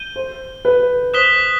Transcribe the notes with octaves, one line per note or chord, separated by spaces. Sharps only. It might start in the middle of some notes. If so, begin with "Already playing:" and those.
Already playing: G6 D#7 G7
C5
B4
C5 D#6 F#6 B6 E7 G7